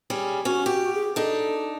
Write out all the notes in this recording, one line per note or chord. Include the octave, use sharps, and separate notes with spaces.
G3 C#4 G#4
C#4 F#4
G4
G#4
D4 D#4 A4